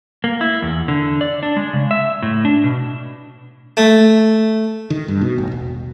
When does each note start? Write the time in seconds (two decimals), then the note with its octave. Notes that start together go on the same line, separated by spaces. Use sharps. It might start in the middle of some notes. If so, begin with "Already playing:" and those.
0.24 A#3
0.41 E4
0.62 E2
0.88 D3
1.21 D5
1.43 D4
1.57 G#3
1.73 C#3
1.91 E5
2.23 A2
2.45 D4
2.64 B2
3.77 A3
4.90 D#3
5.08 G2
5.21 B2
5.38 A1
5.52 E1